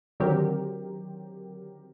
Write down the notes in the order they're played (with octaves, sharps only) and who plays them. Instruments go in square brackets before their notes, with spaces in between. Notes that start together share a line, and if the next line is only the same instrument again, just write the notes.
[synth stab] D3 D#3 F#3 C4 G4 A#4